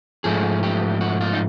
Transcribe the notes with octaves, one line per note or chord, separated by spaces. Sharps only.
G#2 F3 A3 G#4
G4
F#4
F4
D#4